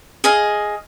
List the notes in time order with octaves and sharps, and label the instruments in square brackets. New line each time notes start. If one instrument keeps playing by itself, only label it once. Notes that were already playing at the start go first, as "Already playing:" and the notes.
[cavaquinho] G#4 D#5 F5